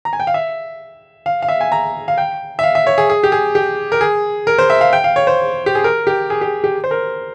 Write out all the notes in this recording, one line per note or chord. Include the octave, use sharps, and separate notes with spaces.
A#5
G#5
G5
F5
E5
F5
F5
E5
G#5
A#5
F5
G5
E5
F5
E5
C#5
G#4
G#4
G4
G#4
G4
A#4
G#4
A#4
C5
E5
F5
G5
F5
C#5
C5
G4
G#4
A#4
G4
G#4
G4
G4
C5
A#4